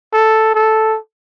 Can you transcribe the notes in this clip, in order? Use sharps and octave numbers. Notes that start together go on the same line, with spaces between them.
A4
A4